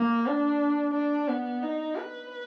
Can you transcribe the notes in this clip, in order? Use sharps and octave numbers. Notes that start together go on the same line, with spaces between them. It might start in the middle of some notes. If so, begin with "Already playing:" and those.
Already playing: A#3
D4
D4
B3
D#4
B4